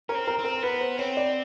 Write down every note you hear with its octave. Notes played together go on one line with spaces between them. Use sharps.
C#4 A#4
C4
A#4
C4
A#4
B3 B4
C5
C4 C#5
D5